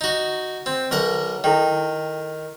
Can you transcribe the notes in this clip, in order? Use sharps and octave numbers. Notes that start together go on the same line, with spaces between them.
D#4 F#4
C4
B1 A#4 F#5
D#3 E4 A4 G5